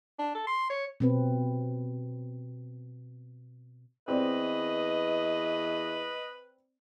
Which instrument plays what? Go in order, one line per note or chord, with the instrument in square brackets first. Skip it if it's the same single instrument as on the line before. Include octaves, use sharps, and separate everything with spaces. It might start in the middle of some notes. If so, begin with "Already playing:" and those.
[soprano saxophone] D4
A4
C6
C#5
[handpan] B2 C4 B4
[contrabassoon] E2 [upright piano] C4 D5 [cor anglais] B4 [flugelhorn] D#5